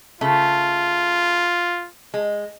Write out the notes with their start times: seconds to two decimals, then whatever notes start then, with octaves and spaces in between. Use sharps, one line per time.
0.21 C#3 A3 F4
2.14 G#3